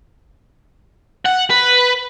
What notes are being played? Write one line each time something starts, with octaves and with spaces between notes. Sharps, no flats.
F#5
B4